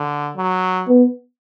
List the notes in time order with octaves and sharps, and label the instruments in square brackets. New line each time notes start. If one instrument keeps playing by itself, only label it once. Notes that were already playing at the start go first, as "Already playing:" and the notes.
Already playing: [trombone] D3
F#3
[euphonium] B3